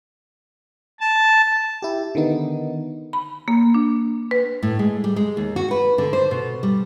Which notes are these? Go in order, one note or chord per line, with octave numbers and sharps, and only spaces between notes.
A5
E4 G4
D3 D#3 B3 D#4
B5
A#3
D4
B4
A2
G#3
G3
G#3
D#2
F#4
B4
D3
C5
B2
G3